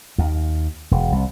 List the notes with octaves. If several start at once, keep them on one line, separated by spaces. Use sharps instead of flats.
D#2
E1
C2